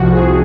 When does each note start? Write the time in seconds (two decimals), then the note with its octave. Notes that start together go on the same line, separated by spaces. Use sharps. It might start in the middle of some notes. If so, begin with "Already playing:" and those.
Already playing: C2 C3 F3 F#4
0.12 G#4